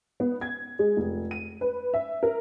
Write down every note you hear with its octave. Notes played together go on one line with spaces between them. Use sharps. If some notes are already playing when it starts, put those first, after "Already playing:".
B3
G#6
G#3
F1
D#7
B4
E5
A#4